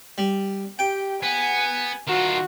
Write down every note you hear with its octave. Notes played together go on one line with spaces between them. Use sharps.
G3
G4 G5
B3 G#5
D#3 F4 F#4